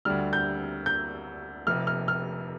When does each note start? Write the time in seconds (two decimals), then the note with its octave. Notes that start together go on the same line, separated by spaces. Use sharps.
0.05 D2 D3 G3 F6
0.33 G6
0.86 G6
1.67 F1 F2 C3 F6
1.87 F6
2.08 F6